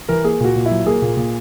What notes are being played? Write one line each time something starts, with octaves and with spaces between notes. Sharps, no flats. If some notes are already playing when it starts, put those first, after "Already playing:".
E3 A#4
A#3 G#4
A#2 F#4
A#2
E4
F#3
A#3 G#4
A#2
A#2